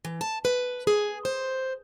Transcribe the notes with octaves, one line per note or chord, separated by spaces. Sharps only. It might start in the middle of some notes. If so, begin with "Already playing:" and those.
E3
A5
B4
G#4
C5